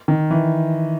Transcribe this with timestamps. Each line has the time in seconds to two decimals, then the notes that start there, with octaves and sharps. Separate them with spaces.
0.08 D#3
0.31 E3